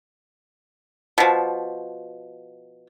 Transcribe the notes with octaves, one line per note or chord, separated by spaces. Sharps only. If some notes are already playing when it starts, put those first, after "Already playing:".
B2 F3